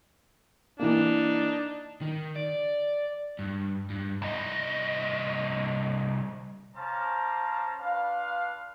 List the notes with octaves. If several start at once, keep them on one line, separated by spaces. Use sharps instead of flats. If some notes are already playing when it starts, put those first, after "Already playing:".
E3 A#3 D4 D#4
D#3
D5
G2
G2
C2 D#5
C#4 C5 F5 A5 A#5 D6
D4 F4 B4 F5